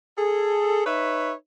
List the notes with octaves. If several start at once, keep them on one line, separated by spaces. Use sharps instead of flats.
G#4 A4
D#4 B4 C#5 E5